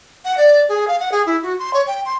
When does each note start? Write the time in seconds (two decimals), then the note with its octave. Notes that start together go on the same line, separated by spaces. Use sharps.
0.25 F#5
0.37 D5
0.69 G#4
0.88 F5
1.00 F#5
1.12 G#4
1.26 E4
1.43 F#4
1.59 C6
1.74 C#5
1.87 G5
2.05 C6